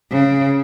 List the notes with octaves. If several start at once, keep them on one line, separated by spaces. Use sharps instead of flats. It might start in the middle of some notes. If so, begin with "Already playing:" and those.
C#3